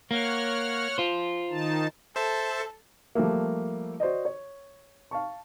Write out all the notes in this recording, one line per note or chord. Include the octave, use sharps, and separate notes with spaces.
A#3 C#5 F#5 F6
F4 C5
D#3 D#4 A5
A4 C5 E5 A5
F3 G3 A3 A#3
F#4 C5 D5 D#5
C#5
F5 A5 C#6